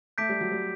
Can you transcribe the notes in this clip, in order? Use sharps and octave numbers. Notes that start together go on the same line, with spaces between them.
A3 D6 G6 B6 D7
G3
F#3
G3